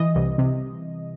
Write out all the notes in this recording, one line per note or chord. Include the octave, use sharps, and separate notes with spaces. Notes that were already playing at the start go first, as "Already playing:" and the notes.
Already playing: E3 D#5
C2
C3